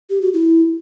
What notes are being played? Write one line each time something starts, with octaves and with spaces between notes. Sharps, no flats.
G4
F#4
E4